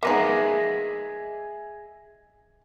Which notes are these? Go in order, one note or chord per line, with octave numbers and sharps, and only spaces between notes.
A#3 B3 D#4 G#4 D#5 E5